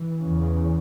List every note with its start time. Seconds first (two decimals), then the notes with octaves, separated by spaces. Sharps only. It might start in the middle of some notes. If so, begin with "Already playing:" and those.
Already playing: E3
0.20 E2 C#3